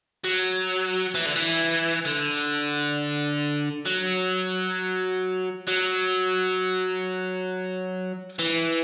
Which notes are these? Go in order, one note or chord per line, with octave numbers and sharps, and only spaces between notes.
F#3
E3
D3
E3
D3
F#3
F#3
E3